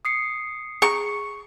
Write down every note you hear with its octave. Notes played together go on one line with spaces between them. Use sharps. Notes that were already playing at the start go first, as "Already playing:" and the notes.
D#6 C7 C#7
G#4 A#5 C#6